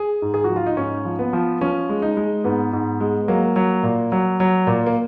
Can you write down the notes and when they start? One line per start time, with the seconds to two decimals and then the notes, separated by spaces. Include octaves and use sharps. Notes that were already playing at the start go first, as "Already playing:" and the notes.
Already playing: G#4
0.22 G#2
0.34 G#4
0.44 F#4
0.50 F3
0.56 F4
0.66 D#4
0.77 G#2 C#4
1.05 F3
1.19 B3
1.33 F3
1.61 F3 C#4
1.89 G#3
2.02 D#4
2.17 G#3
2.44 G#2 B3
2.73 G#2
3.00 G#3
3.28 F#3 A#3
3.56 F#3
3.83 A#2
4.12 F#3
4.40 F#3
4.67 A#2
4.86 A#3